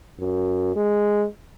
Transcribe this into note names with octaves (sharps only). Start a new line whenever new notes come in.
F#2
G#3